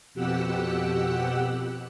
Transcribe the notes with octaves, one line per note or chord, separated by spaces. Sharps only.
F2 B2 G4 F#5 E6 F#6